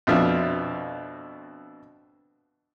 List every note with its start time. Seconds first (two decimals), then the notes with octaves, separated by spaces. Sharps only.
0.07 F2 B2 D4 F4 E5 F6